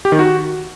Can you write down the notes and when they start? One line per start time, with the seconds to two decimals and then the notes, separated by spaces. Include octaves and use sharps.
0.05 G4
0.12 D#3
0.19 F#4